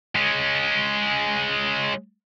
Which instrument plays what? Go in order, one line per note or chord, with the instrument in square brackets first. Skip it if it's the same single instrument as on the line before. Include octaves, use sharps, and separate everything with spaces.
[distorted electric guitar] G#3 C#4